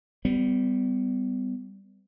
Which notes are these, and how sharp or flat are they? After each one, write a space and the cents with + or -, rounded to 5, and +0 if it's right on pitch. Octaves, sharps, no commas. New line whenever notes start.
G3 +0 B3 +35